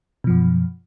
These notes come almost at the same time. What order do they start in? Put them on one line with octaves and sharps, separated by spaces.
B2 F3 F#2